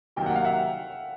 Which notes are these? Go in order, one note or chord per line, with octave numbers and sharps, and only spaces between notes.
C3 D#3 F#3 A#3 G5
F#5
F5
E5 F#5